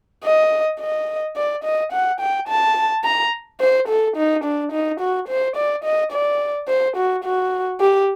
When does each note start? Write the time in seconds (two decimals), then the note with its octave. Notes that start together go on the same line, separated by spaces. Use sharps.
0.24 D#5
0.80 D#5
1.36 D5
1.64 D#5
1.92 F#5
2.20 G5
2.48 A5
3.04 A#5
3.61 C5
3.88 A4
4.17 D#4
4.44 D4
4.72 D#4
5.00 F#4
5.28 C5
5.56 D5
5.84 D#5
6.13 D5
6.69 C5
6.97 F#4
7.24 F#4
7.81 G4